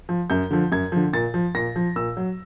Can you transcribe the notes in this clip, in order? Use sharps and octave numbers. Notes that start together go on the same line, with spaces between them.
F3
F#2 G6
D3 F3
F#2 G#6
D3 F3
A#2 A6
F3
A#2 A#6
F3
A#2 E6
F#3